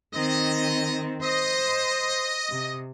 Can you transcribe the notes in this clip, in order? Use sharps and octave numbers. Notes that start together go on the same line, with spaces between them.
D#3 C4 D#5
C5 D#5
C3